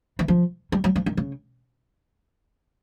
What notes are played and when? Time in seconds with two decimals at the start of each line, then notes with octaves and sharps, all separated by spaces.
0.19 E3
0.28 F3
0.72 G3
0.84 F#3
0.96 F3
1.06 D#3
1.17 C#3